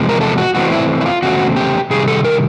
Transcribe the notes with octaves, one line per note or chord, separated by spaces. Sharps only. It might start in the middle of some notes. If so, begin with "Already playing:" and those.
Already playing: E2 C3 F3 G#3
A#4
A4
F#4
C3 E3 A3 C4 F#4
E4
E4
F4
E2 C#3 A3 C4 F#4
G4
C3 D#3 G3 G#4
A4
A#4